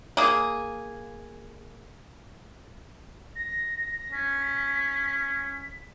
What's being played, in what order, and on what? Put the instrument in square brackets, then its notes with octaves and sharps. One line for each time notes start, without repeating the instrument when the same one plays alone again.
[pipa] A#3 G#4
[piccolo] A#6
[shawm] C#4 [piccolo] B6